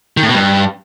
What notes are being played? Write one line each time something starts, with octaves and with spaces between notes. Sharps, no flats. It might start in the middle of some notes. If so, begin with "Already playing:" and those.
D#3
A2
B2
G2